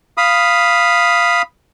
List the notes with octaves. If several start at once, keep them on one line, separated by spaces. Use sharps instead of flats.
F5 B5 D#6